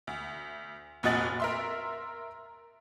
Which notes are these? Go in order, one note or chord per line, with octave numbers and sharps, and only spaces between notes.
D2
F1 A#2 F#4 D#5 A6 F#7
A#4 E5 C6